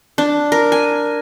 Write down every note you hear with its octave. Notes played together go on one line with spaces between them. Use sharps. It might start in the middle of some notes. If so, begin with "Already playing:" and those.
D4
A#4
G#5